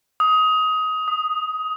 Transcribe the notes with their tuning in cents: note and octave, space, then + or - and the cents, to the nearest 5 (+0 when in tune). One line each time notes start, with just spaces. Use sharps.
D#6 +20
D#6 -5